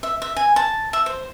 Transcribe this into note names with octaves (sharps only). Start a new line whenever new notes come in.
E5
E5
G#5
A5
E5
C5